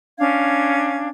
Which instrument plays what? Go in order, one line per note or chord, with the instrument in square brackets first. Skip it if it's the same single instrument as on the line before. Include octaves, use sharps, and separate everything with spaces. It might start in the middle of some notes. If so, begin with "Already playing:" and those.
[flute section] C#4 D4 F5 G#6